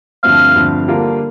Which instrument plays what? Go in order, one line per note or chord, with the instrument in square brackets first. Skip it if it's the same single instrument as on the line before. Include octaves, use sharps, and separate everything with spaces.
[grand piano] G2 D3 F3 A3 C4 [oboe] F5
[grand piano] G2 D3 F3 A3 C4
D3 G3 A#3 F4 A#4